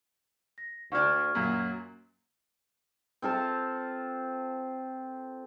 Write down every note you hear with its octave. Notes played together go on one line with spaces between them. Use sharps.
A#6
D2 D3 D4 C#6 F6 G#6
F#2 A#2 F#3
C4 F4 A4 A5